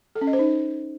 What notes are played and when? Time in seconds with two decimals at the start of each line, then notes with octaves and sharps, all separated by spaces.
0.16 A4
0.21 C#4
0.27 D#5
0.33 C5
0.39 D#4